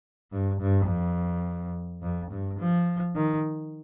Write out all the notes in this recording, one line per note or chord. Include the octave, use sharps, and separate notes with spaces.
G2
G2
F2
F2
G2
F3
D#3